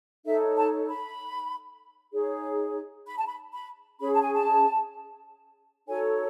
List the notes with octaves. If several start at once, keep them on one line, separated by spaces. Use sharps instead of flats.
D#4 A4 C#5 E5
A5
B5
D#4 G#4 C#5
B5
A5
B5
B5
C#4 G#4 C#5 B5
A5
G#5
A5
D#4 F#4 A4 C#5 G#5